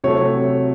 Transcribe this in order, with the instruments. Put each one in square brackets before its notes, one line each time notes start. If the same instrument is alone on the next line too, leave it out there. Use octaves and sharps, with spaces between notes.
[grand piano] C3 F#3 A3 C#5